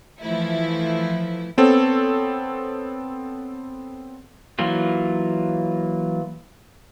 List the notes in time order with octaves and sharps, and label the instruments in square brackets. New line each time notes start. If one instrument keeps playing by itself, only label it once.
[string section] E3 F3 A3 E4
[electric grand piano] B3 C4 A4 C#5
[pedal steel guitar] E3 F#3 A#3 F4